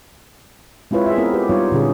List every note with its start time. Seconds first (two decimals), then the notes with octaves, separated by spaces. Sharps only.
0.91 G#3 C4 E4 F4 B4 C#5
1.06 G#4 E5
1.18 B3 C4 E4 A#4
1.34 G4 B4
1.49 G3 B3 D#4 F4 C#5
1.72 A#2 D3 C#4 G#4